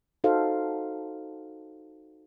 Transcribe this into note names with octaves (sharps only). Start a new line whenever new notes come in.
D#4 F#4 A4 C5 F5